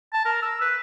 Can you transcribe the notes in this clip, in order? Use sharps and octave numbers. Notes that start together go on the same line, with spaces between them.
A5
A#4
E6
B4